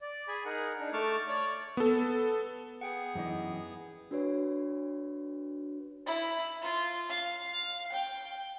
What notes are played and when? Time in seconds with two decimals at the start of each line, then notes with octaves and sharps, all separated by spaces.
0.01 D5
0.28 G#4 G#5 B5
0.45 D#4 G#4 A#4 F#5
0.79 D4 D#4
0.93 A3 A5 C#6 D6 F6
1.28 C#5 D5 C#6
1.77 B3 A4
2.81 B3 G#4 F#5 G5
3.15 F#2 E3 D#4
4.11 D4 F#4 B4 C#5
6.06 E4
6.62 F4
7.09 F5
7.92 G5